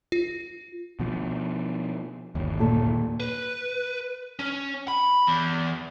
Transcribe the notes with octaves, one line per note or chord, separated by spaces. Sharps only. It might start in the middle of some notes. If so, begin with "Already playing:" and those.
F4
B2 F3
G1 D#2
A#2 D#3 A4
B4
C#4
B5
E2